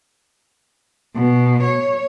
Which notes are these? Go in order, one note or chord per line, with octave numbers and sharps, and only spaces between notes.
B2
C#5